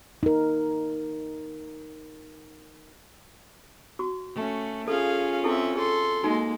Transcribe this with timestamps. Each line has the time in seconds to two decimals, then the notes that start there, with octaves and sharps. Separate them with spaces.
0.23 D#4 A#4
3.99 F#4 C#6
4.35 A3 C#4
4.88 C#4 F4 G#4 A4 F5
5.44 C4 E4 G#4 A4 E5
5.76 G#4 A4 C6
6.23 G#3 A#3 D#4 F#4